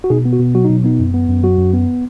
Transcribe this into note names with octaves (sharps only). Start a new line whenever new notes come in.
F#4
B2 D#4 G#4
B3
F#4
B2
F#3 F#4
B2 D#4
B3 D#4
F#2
B3
F#2
F#3 F#4
F#2
B3